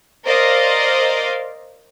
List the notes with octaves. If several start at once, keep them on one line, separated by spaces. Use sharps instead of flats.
A#4 C5 D5 D#5 F5